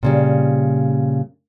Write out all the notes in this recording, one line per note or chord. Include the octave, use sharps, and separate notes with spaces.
A#2 C#3 G3